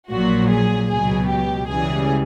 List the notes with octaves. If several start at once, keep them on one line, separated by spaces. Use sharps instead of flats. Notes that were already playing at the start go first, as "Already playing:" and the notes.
A#1 A#2 F#3 F#4
G#4
C#2 B2 F#3 G#4
G4
C#2 C#3 E3 G3 G#4